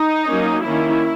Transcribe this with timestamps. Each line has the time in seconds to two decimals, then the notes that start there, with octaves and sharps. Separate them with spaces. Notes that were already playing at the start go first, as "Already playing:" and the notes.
Already playing: D#4
0.26 F#3 A#3 C#4
0.63 D#3 A#3 C#4 E4